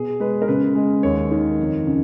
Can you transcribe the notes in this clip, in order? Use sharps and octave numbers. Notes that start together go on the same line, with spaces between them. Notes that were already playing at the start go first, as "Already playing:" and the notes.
Already playing: B2 G#4
G#3 B4
A#4
C#3 B4
G#3
D#2 C#5
D#3
F2
C#3